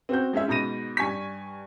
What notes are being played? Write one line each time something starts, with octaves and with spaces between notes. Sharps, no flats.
C4 F#4 G6
G#3 C#4 G#4 E5
G#2 B2 B5 A#6 D#7
G2 G#5 C#6 B6